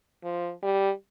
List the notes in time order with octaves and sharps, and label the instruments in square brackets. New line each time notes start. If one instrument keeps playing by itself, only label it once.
[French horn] F3
G3